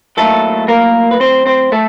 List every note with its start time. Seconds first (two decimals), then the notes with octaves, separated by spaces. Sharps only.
0.17 A2 F#3 A3 A#3 D#4 A4
0.68 A#3 A#4
1.11 B4
1.20 C4 C5
1.46 C4 C5
1.72 A3 A4